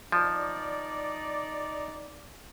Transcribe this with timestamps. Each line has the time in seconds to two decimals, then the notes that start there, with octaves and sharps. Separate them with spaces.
0.12 F3 D#4 D5